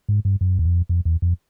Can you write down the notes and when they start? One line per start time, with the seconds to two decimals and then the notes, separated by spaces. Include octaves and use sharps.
0.09 G#2
0.25 G2
0.41 F#2
0.59 E2
0.65 F2
0.89 F2
1.05 E2
1.22 F2